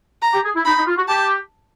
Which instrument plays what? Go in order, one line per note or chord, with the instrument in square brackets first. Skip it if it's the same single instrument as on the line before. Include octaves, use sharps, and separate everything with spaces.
[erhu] A#5
[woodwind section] G4
G#4
E4
[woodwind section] D#4 [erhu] B5
[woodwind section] D#4
F4
F#4
[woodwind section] G4 [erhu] A5